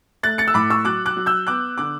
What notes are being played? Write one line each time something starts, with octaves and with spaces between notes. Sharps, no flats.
A3 F#6 A6
A6 C#7
E6
A2 B5 D6
C#6 E6
F#3 D6 F#6
D6 F#6
F#3
E6 G6
B3 D6 F#6
D3 D6 F#6